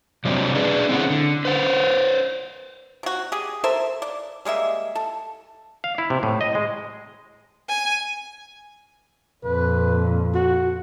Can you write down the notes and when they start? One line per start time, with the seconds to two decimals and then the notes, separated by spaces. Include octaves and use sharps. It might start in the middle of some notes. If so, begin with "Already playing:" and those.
0.25 C3 F#3 G3 C4 D4
0.55 D4 G#4 B4
0.89 C4 C#4 E4 G#4 F#5
1.10 D3
1.45 B4 C5 F#5
3.03 C3 F#4
3.32 G4 G#4
3.64 A4 A#4 C5 E5
4.02 D5
4.45 G3 G#3 A#3 E5
4.95 A4
5.84 F5
5.98 E4
6.10 C3
6.23 A2
6.41 D#5
6.55 G#3
7.69 G#5
9.44 F2 A#2 B4
10.34 F#4